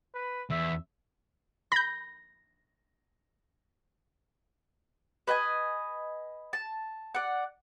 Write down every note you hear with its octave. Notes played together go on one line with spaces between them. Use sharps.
B4
E2 E5
B5 G6 A#6
B4 D#5 G5 G#5
A5
D5 F#5